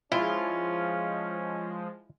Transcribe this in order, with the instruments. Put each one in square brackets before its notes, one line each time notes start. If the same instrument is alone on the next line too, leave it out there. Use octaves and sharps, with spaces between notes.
[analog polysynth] F3 G#3 [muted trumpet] C#4 [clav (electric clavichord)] E4 [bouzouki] F4